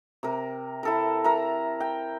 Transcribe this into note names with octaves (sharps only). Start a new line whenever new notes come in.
C3 A#4
E4 A4 A#4
A#4 E5 A#5
G5